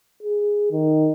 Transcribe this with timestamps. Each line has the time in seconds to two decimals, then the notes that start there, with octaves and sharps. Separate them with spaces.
0.23 G#4
0.71 D#3